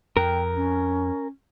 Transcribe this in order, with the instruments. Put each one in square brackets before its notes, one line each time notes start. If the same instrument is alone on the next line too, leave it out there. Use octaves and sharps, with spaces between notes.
[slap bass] F2 [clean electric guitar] A#4 [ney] G5
[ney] C#4